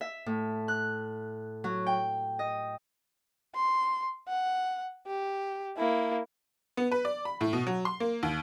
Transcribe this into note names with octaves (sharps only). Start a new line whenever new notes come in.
E5
A2
F#6
F#3
G5
D#5
C6
F#5
G4
A#3 E4
B3
B4
D5
B5
A2
B2
F#3
C6
A#3
D#2